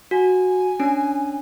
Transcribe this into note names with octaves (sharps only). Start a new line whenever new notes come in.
F#4 G#5
C#4 D4